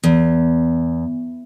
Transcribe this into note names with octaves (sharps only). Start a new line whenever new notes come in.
E2